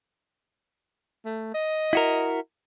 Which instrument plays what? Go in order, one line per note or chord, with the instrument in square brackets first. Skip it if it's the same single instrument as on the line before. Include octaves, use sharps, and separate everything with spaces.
[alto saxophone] A3
D#5
[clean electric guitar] E4 F#4 A#4